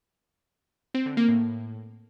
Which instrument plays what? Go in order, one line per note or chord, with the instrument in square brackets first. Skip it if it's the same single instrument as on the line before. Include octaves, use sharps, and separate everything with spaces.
[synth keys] C4
D3
A#3
A2